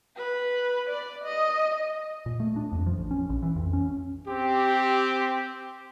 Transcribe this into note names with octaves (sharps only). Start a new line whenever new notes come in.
B4
D5
D#5
A#2
A3
D4
F2
F3
A1
C#4
A#1
E3
F2
C#4
C4 G4